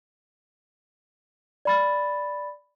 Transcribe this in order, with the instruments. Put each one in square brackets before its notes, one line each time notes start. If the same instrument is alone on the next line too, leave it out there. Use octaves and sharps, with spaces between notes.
[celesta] D5 B5 A6